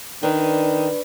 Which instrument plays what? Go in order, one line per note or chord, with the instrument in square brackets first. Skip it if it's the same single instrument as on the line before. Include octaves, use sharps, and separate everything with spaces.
[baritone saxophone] D#3 [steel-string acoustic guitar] D4 B4